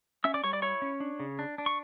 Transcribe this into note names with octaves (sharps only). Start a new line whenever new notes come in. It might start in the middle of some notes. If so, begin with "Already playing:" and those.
C#4 E5 E6
D5 D6
G3 C#5 C#6
D5 D6
E4 C#5 C#6
C#4
D4
C#3
D4
D4
C#6